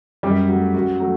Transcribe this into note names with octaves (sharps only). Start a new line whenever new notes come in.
F#2 G3 G4
F#3 A3
F#2 F#4
F#3 A3